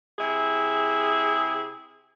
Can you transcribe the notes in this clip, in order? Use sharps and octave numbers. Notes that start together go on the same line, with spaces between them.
C3 E4 G#4